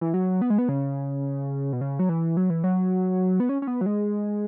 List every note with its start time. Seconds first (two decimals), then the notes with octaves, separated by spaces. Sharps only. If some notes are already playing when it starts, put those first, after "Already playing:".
0.01 E3
0.14 F#3
0.41 B3
0.50 G#3
0.58 B3
0.69 C#3
1.73 B2
1.81 C#3
1.99 F#3
2.09 E3
2.37 F#3
2.50 E3
2.64 F#3
3.40 B3
3.49 C#4
3.62 C#4
3.67 B3
3.81 F#3
3.86 G#3